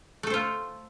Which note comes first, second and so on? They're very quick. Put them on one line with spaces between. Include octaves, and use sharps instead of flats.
A3 A4 C5 F4